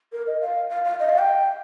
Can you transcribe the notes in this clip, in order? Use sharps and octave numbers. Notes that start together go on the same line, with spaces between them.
A#4
D#5
F5
F5
F5
D#5
F5
G5